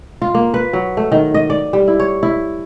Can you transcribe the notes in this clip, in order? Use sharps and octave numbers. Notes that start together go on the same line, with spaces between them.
F4
A#3
B4
F#3
A3
D#3
D#5
D5
G3
E4
C#5
E4